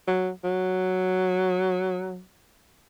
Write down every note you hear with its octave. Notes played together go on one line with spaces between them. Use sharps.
F#3
F#3